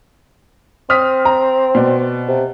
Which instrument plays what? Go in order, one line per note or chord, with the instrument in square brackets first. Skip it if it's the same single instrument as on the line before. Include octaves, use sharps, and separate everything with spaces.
[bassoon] C4 [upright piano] D#6 F6 B6
[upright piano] A#5
B2 D5
[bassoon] C3